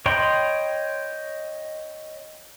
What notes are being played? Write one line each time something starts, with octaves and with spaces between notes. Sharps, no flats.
C#5 D#5 G5 B5 C6